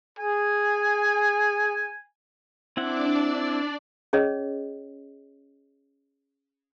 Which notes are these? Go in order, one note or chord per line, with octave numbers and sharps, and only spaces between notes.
G#4 G#5
C4 D4 E4 D5 F#5
C#4 G#4 C#5 D#5